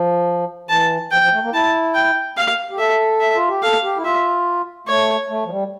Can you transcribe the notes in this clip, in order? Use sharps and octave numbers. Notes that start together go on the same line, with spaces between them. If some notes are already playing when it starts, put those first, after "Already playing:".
Already playing: F3
E3 A5
F3 G5
F3
A3
A#3
E4 A5
G5
F5
G4
A4 E5
E5
F4
G4
A4 F5
G4
E4
F4 E5
A3 C#5
A3
F3
G3